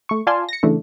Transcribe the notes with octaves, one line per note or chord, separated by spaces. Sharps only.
A3 C#6
F4 D5 F5 G#5 A5 C6
A#6 C#7
C#3 E3 A3 D4